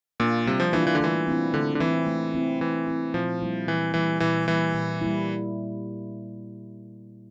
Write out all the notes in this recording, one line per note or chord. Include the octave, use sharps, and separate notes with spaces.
A#2 A#3 D4 F4
C3 G3
F3
E3 A#3 D4 F4
E3
D3
E3 A3
C4 E4
D3 A3
D3
E3 C4 E4
A3
C4 E4
E3 A3
C4 E4
A#2 F3
G3 A#3 E4
A#2 E3
E3 G3 A#3 E4
A#2 E3
E3 G3 A#3 E4
A#2
G3 A#3 E4